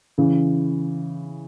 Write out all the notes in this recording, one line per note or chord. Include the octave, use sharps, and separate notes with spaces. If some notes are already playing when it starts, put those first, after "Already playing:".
C#3 E3